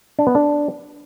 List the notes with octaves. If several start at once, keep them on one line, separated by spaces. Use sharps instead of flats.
D4
B3
D4